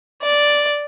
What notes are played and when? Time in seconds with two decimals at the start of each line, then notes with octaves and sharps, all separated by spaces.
0.23 D5